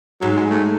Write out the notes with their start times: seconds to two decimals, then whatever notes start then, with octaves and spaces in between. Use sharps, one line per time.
0.21 G#2 F#3
0.37 G#3
0.51 A3